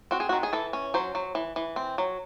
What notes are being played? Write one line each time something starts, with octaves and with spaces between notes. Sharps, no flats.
C4 F#4
G#4
F#4
D#3
G#4
E3 A4
C#4
F#3 C5
F#3
E3
E3
C4
F#3